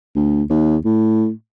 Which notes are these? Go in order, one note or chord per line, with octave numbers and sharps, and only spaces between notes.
D2
D#2
A2